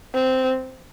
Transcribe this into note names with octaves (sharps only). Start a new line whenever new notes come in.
C4